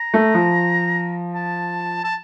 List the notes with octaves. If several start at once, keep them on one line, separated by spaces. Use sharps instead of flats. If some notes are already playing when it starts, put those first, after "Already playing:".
Already playing: A#5
A3
F3
A5
A5